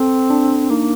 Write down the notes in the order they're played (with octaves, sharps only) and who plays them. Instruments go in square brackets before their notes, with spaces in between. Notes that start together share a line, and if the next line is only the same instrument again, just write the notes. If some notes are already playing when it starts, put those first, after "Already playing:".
Already playing: [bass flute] C4 [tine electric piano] A4
[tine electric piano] D4
[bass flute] A#3 [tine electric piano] D#4